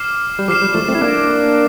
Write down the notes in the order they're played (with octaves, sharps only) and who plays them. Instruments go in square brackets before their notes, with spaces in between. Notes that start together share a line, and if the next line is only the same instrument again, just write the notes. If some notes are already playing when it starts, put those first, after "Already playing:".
Already playing: [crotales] D6 F6 C7 E7
[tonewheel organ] G3
[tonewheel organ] F3 [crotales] D6 F6 C7 E7
[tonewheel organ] G3
F3 A3
A3 C4
E4
A#3 D4